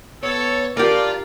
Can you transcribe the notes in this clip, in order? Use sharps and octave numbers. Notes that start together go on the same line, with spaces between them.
B3 A4 C#5
D4 F4 G4 A#4 D5